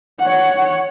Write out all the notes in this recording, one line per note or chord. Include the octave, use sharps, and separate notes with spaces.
C#5 F#5